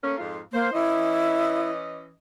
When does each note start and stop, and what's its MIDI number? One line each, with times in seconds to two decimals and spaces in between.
0.03 0.15 57
0.03 0.15 58
0.03 0.15 61
0.18 0.39 41
0.18 0.39 44
0.18 0.39 65
0.53 0.73 58
0.53 0.73 72
0.73 2.11 52
0.73 2.11 61
0.73 1.71 64
0.73 2.11 75